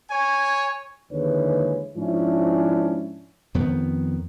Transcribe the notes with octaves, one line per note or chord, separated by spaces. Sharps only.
C#5 G#5
D#2 D3 E3 G#3 B4 C#5
G#2 F3 C#4 D4 E4
F2 D#3 B3